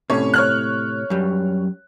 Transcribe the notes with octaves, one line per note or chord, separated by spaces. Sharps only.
A2 C3 C#4 C#5
C#5 F6 F#6
F#2 G3